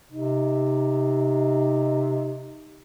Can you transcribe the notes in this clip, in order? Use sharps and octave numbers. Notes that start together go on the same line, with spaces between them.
C3 D#4